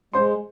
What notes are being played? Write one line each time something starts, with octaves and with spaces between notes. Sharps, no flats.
G#3 C5 C6